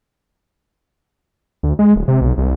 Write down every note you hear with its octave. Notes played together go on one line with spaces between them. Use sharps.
D2
G#3
D1
C3
B1
C2